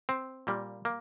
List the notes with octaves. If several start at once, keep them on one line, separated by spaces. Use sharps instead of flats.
C4
A#2 G3 A#3
A#3